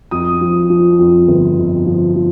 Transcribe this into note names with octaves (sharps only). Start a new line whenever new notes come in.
F2 D#6
F3
F3
F2
G1
F2
F3
F3